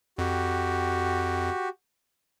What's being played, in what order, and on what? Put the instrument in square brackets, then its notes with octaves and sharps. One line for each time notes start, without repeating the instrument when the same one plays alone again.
[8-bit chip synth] F2 [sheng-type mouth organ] F#4 G4